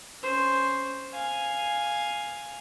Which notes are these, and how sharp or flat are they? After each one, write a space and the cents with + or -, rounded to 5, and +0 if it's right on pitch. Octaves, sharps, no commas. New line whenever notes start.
C#4 +0 C5 +0
F5 +0 G#5 +0